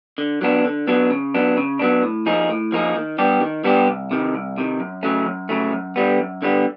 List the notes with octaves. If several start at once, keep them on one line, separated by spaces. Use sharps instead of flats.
D3
F#3 B3 D4
D3
F#3 B3 D4
C#3
F#3 B3 D4
C#3
F#3 B3 D4
A2
F3 A#3 D#4 G#4
A2
F3 A#3 D#4 G#4
D#3
G3 B3 D4 G4
D#3
G3 B3 D4 G4
C2
C3 D#3
C2
C3 D#3
F#2
C#3 F#3 A3 C#4
F#2
C#3 F#3 A3 C#4
F#2
D3 G3 B3
F#2
D3 G3 B3